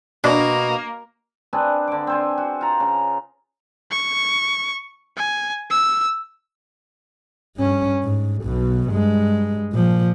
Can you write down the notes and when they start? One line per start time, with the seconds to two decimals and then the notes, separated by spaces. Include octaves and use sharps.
0.24 B2 A#3 D4
1.53 C4 D4 G#4 B4
1.88 D3 D6
2.07 C4 C5 G#5
2.38 F#4
2.61 F4 A#5
2.80 C#3
3.91 C#6
5.16 G#5
5.70 E6
7.56 G2 C#4
8.04 G#2
8.43 B1 B2
8.89 G2 G#3
9.72 A#2 F3